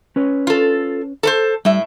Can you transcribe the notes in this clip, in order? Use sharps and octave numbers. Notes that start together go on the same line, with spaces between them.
C#4 B4 C#5
F4 A4
A4 B4 C5
A2 G3 E5